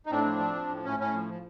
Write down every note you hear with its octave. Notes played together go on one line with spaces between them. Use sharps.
D#4
A2 C4 D4
F3
F3
F3
A2
A2 C#4
A2 C#4
F3
F3